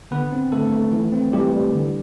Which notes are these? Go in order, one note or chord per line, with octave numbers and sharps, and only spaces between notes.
D3 B3 B4
C4
D3 A3 A4
A3
E3
C4
E3 G3 G4
G3
D3